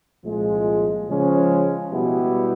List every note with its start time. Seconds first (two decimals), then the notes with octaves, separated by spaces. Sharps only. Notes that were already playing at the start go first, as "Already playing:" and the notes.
0.24 C2 A#2 F3 G#3
1.08 C#3 F3 G#3 C#4
1.91 B2 G3 B3 E4 G4